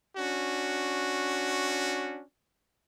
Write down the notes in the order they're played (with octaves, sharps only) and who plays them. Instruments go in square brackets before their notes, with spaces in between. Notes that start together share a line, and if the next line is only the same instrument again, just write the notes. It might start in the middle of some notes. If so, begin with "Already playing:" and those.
[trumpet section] C#4 D4 F#4